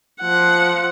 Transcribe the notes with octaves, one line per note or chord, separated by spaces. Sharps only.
F3 F#5